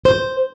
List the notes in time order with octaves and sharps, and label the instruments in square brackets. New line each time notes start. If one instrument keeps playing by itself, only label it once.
[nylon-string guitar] C5